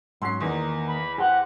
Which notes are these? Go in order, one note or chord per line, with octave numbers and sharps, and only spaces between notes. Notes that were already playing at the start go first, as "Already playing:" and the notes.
G#2 F#3 C#4 C6 C7
E2 D#3 A#3 D#4
B5
G4 C5 F#5